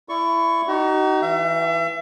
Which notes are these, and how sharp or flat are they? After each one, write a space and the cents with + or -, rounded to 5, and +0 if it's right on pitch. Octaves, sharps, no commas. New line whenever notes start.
E4 +20 D5 +0 C#6 +0
D#4 +0 F#4 +45
E3 -5 E5 +40